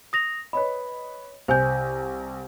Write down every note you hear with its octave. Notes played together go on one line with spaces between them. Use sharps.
D#6 A#6 F7
B4 C#5 D#5 B5
C2 C5 G#5 G6